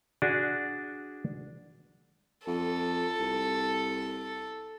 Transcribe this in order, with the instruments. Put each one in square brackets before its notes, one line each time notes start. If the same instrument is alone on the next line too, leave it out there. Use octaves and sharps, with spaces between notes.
[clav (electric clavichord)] D4 F#4 G#4
[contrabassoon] F2 [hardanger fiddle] A4
[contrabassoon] C2